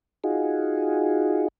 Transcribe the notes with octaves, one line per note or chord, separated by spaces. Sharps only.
D#4 F4 F#4 G#4